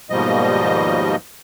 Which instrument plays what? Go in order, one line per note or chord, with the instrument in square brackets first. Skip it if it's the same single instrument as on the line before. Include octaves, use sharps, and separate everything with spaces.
[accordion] D#2 G#2 B2 F3 G3 D#5